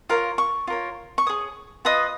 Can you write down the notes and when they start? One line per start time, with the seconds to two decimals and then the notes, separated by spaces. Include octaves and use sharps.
0.09 F4 A#4 C#5 F5
0.38 C#6
0.67 F4 A#4 C#5
1.18 C#6
1.27 G#4 C#5 D#6
1.85 F4 B4 D#5 D#6